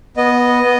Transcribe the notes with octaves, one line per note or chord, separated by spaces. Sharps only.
B3 D#5
B3